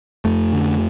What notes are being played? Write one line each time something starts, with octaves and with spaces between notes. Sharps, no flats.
F2 A3
D3